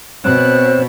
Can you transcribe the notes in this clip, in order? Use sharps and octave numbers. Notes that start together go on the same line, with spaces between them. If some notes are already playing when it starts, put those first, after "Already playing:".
B2 C4 C5 C#5 E6 F#6